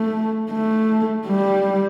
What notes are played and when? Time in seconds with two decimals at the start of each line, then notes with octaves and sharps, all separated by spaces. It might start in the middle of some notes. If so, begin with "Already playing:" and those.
Already playing: A3
0.50 A3
1.27 G3